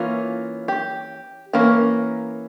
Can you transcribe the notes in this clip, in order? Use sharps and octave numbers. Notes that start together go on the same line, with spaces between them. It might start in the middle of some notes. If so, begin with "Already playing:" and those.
Already playing: E3 A#3 C#4 F4
G4
E3 A#3 C#4 A#4